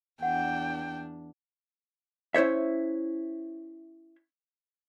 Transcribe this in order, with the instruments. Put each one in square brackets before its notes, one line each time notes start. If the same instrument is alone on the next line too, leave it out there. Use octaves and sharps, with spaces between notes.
[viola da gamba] E2 D4 [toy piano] F#5 [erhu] G5
[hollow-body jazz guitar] C#4 E4 C5 C#5 E5